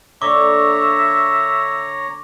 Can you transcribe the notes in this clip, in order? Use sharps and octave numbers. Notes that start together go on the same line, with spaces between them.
D3 A#3 C#5 E5 A#5 C#6 D6